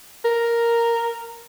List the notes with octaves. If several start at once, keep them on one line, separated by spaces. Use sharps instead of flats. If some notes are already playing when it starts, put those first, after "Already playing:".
A#4